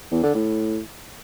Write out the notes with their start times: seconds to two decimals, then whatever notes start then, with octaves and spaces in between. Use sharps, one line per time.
0.11 E2
0.23 D3
0.34 A2